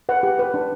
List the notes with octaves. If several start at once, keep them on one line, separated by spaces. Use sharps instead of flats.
B4 F#5
G4
B4
D4